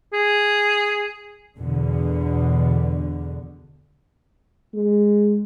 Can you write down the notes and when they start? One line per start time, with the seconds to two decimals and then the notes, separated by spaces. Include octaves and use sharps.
0.13 G#4
1.58 E2 B2 D3
4.74 G#3